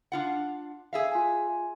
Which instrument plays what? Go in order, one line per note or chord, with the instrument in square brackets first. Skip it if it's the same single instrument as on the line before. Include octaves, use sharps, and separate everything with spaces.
[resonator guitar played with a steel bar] D4 F4 F#5
G#4 E5 F5
[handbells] F4 G#5